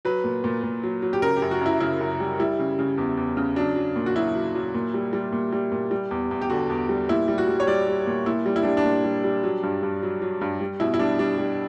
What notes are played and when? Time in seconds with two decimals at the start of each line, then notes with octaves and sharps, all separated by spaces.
0.05 F#3 B4
0.24 A#2
0.44 A#2
0.63 A#2
0.83 F#3
1.02 F#3
1.13 G4
1.22 C#3 A#4
1.37 G4
1.42 F#2
1.51 F#4
1.61 F#2 E4
1.80 C#3 E4
2.00 F#2
2.20 G3
2.39 G3 E4
2.59 C#3
2.79 C#3
2.98 E2
3.17 E2
3.37 C#3
3.56 F#3 D4
3.76 F#3
3.96 A#2
4.06 F#4
4.16 F#3 E4
4.35 F#3
4.55 F#3
4.75 A#2
4.94 G3
5.13 G3
5.33 A#2
5.53 G3
5.72 A#2
5.91 G3
6.11 E2
6.31 E2
6.41 G4
6.50 D3 F#4
6.70 E2
6.89 G3
7.09 A#2 E4
7.28 G3
7.38 F#4
7.48 G3
7.60 C#5
7.67 G3 D5
7.87 G3
8.07 A#2
8.26 A#2 E4
8.46 G3
8.56 E4
8.62 D4
8.65 G3
8.77 D4
8.85 A#2
9.04 G3
9.24 G3
9.43 F#3
9.63 G2
9.83 G2
10.03 F#3
10.22 F#3
10.41 G2
10.61 G3
10.80 B2 E4
10.94 E4
10.99 G3 D4
11.19 G3 D4
11.38 G3